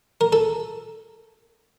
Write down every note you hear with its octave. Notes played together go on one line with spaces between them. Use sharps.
A#4
A4